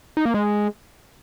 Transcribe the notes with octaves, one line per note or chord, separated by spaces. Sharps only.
D#4
A#3
G#3